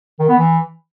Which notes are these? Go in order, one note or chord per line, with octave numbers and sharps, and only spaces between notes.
D#3
B3
E3